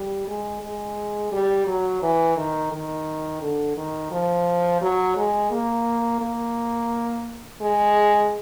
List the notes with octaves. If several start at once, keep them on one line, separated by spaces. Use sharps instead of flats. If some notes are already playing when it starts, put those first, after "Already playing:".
Already playing: G3
G#3
G#3
G3
F#3
E3
D#3
D#3
D3
D#3
F3
F#3
G#3
A#3
A#3
G#3